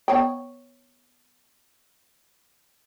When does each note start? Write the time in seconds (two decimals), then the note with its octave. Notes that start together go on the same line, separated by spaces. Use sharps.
0.08 B3 C#5 G5